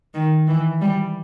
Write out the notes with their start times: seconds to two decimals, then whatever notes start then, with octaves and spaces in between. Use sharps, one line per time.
0.14 D#3
0.47 E3
0.81 G3